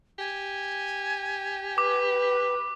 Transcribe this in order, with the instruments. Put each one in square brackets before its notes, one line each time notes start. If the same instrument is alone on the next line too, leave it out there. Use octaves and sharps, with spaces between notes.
[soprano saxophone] G4 [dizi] G#5
[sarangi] B4 [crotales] D6